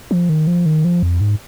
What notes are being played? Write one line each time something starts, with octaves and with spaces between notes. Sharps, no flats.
F3
D#3
F3
D#3
F3
F2
G#2